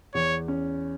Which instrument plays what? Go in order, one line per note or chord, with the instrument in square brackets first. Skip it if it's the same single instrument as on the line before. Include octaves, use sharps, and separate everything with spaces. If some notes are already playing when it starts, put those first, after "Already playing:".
[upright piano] E2 [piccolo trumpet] C#5
[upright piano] C#4